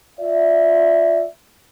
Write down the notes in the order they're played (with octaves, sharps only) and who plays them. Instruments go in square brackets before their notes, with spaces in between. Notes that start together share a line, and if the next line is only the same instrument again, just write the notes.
[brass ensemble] F4 D5 E5